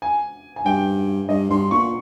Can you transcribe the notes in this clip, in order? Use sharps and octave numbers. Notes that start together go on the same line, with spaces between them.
G#5
G#5
G2 G5
G2 D#5
G2 C6
A#2 C#6